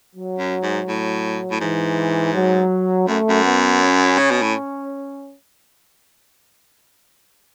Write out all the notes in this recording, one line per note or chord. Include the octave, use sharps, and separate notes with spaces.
F#3
F#2
G#2
A2
A2
G#2 E3
F#3
F#2 A3
F#2
B3
C#4
C#3
B2
A2